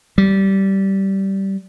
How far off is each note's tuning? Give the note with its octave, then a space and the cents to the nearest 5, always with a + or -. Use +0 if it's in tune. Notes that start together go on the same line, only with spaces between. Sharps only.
G3 -15